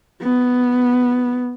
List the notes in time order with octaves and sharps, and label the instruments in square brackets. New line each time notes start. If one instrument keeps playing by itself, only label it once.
[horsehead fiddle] B3